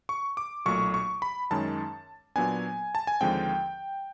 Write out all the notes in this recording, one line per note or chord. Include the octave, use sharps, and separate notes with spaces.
C#6
D6
B1 A#2 F#3 A3 C#6
C#6
B5
F#2 D#3 G#3 C#4 A5
A#2 F#3 B3 D4 G#5
A5
G#5
D#2 D3 F3 G#3 C4 G5